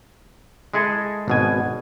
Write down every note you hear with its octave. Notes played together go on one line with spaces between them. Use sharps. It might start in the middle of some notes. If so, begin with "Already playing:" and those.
G#3 E4 G#4 A4 D#5
G#1 B2 G#5